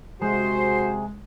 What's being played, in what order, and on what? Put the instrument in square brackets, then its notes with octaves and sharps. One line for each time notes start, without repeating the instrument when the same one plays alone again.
[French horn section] F#2 C4 F#4 [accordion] C3 G#4 [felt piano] G#3 [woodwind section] C5